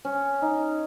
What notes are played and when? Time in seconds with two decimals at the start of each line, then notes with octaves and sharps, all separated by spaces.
0.05 C#4
0.42 D#4